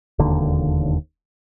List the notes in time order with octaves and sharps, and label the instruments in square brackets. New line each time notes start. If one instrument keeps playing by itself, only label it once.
[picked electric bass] E1 D#2 D3